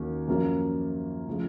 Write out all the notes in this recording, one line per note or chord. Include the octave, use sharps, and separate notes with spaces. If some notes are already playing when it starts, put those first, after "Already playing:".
Already playing: D#2 D#3 A#3 C#4 F#4
F#2 F3 A#3 C#4 F4
C#3 F3 A3